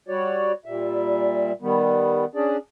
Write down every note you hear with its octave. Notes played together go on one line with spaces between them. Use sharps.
G3 F#4 C#5 D5
A#2 G3 E5
D#3 G3 B3
C#4 D4 G#4 D5